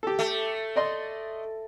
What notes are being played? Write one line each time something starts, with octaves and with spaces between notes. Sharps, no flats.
G4 A4
A3
D5 D#5 C6